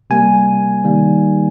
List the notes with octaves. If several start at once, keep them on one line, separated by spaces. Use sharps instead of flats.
C3 G3 A#3 G#5
D#3 G3 A#3